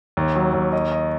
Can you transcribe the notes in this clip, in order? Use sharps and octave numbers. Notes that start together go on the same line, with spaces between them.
D#2
F#3
D#2
D#5
D#5